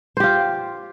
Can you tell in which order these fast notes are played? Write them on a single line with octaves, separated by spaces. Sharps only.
C5 G4 F4